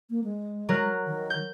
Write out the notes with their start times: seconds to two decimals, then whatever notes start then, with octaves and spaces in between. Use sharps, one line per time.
0.10 A#3
0.24 G#3
0.69 F#3 A#4 F#6
1.06 D#3
1.30 G6